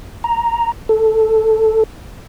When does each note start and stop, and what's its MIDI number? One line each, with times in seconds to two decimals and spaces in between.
0.24 0.72 82
0.89 1.84 69